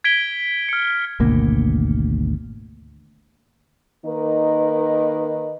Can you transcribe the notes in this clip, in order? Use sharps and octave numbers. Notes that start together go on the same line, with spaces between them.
G#6 B6 D7 G7
F6 C#7
G#1 D2 B2 A#3
D#3 A#3 D#4 A#4 B4 D#5